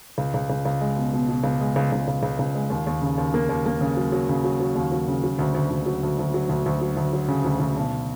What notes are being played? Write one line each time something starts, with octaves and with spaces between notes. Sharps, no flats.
C#2
C#2
C#2
C#2
G#3
B2
B2
B2
C#2
G#3
C#2
C#2
C#2
C#2
C#2
G#3
D#2
D#2
C#3
D#2
A#3
D#2
A#3
C#3
F#3
F#3
C#3
F#3
F#3
D#2
F#3
C#3
F#3
D2
D2
D2
F#3
D2
D2
F#3
D2
D2
F#3
D2
F#3
C#3
D2
D2
B1